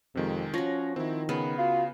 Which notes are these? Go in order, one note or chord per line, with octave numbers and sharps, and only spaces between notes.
F2 C3 D#3 G#3
F3 C#4 F#4 C#5 A#6
D#3 C4 E4
C#3 B3
F4 F#4